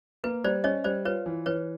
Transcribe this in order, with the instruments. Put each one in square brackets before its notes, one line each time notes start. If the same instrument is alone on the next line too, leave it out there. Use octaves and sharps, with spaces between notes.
[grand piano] A#3 [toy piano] B4
[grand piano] G3 [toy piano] C5 D5
[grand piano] C#4 [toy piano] C#5 D#5
[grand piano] G3 [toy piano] C5 D5
[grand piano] F4 [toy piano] B4 C#5
[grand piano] E3
[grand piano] E3 [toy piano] B4 C#5